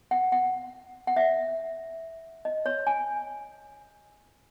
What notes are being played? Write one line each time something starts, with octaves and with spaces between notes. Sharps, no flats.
F#5
F#5
F#5
E5
D#5
C#5
G#5